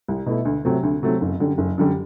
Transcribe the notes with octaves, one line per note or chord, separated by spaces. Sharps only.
C2
B2 A3 E4
D2
C3 F#3 A3 C4
D2
C3 F#3 A3 C4
F#1
F#2 D3 G3
F#1
F#2 D3 G3